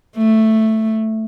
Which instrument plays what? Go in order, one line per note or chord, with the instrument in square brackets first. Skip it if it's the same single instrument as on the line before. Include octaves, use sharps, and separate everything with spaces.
[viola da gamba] A3